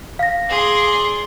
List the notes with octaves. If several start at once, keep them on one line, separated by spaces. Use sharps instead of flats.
F5 A#6
G#4 D5 C6